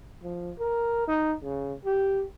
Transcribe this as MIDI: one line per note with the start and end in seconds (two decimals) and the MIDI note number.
0.23 0.51 53
0.59 1.06 70
1.08 1.34 63
1.43 1.74 49
1.85 2.23 67